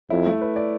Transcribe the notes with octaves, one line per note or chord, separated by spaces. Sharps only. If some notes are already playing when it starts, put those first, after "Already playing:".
F2 E4
A3
B4
D5